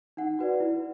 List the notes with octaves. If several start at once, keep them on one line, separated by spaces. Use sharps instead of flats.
D#4 F#5
F#4 B4 D5
E4